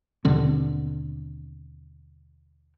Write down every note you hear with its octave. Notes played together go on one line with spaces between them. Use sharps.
D#2 B2 D3 C4